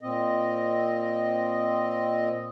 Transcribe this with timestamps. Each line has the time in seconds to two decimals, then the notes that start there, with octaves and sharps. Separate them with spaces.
0.01 A#2 C4 D#5